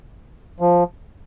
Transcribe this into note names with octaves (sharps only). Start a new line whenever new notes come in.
F3